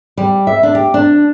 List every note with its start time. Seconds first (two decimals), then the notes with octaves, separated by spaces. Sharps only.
0.18 G3
0.47 E5
0.63 D4
0.75 G4
0.94 D4